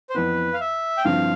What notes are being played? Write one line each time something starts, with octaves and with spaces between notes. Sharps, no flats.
C5
F2 E3 B3 B4
F5
E5
G5
G2 D3 F3 C4 E4 F5